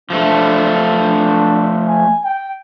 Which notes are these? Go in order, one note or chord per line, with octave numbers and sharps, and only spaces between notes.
F3 A3 D4
D4
G#5
G5